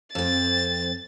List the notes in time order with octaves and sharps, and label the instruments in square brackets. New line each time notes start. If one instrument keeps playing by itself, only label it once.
[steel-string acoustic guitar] F2 C4 [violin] A6